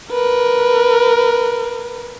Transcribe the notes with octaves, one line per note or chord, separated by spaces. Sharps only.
A#4 B4